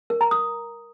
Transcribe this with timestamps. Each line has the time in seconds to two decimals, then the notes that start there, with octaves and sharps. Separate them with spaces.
0.10 A#4
0.21 A#5
0.31 D#6